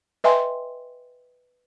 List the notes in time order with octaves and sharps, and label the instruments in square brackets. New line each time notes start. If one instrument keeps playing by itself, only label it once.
[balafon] B4 D#5 E5 G5 G#5 C6